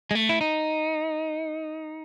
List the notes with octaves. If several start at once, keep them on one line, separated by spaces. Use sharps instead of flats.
G#3
A3
E4
D#4